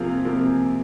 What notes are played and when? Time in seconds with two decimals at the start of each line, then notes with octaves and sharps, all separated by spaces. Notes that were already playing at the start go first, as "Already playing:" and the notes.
Already playing: C3 F3 A#3 F4 G#4
0.25 C3 F3 A#3